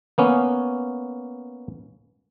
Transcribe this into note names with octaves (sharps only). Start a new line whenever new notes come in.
A#3 B3 C#4